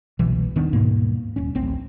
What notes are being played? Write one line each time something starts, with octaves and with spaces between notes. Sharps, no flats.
F#1 C2 B2 E3
D#1 D#3 B3 D4
D#1 G#2 B2 A#3
D#1 C#4
D1 A1 C4